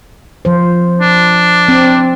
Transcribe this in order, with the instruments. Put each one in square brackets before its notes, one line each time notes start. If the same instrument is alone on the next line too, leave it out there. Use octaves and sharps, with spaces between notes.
[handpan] F3 C5
[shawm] D4
[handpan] C4